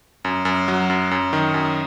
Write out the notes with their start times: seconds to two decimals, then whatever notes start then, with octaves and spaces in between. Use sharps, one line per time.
0.25 F#2
0.45 F#2
0.68 F#3
0.90 F#2
1.11 F#2
1.33 D#3
1.54 F#2